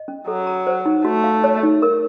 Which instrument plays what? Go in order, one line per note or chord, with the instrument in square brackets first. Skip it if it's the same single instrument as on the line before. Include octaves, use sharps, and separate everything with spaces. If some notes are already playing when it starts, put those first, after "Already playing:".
Already playing: [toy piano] D#5
C#4
[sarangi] F#3 [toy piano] A4
[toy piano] A#5
C5
D#4
[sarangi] A3 [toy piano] F#4
[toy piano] F5
C#5
D#4
A#4